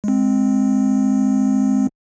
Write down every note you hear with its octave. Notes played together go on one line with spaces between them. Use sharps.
G#3 C4